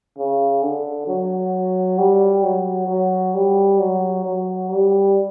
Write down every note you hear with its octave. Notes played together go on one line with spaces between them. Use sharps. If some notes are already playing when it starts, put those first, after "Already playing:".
C#3
D3
F#3
G3
F#3
F#3
G3
F#3
F#3
G3